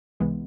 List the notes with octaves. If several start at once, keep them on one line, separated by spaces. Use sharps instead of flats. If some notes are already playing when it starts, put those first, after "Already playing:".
C#2 C3 E3 G#3 B3